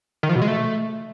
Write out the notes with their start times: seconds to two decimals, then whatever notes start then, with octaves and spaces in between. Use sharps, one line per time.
0.23 D#3
0.29 F3
0.35 B2
0.42 G#3
0.48 A3